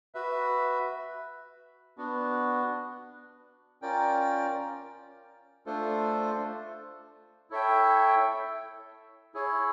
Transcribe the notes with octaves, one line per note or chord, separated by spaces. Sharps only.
F#4 B4 E5
B3 D4 F#4
C#4 F4 A#4 D5 G5
A3 D4 F4 A4 C5
E4 A4 C#5 E5 G5
E4 G#4 C#5